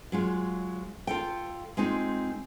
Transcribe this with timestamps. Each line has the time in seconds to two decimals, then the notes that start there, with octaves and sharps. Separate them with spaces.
0.12 F#3 G#3 F4
1.07 F4 A4 G5
1.77 G#3 C4 D#4 F4